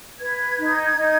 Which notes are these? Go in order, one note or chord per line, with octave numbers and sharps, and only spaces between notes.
B4 G#6
D#4
D#4